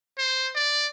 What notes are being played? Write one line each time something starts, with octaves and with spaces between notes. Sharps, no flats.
C5
D5